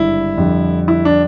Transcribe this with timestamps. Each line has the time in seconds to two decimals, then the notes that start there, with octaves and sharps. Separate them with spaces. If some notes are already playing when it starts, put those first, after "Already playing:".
Already playing: G#1 G2 D3 E4
0.37 F2 D3 G3
0.88 E4
1.05 D4